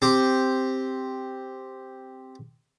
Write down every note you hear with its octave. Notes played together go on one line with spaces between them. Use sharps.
C4 G4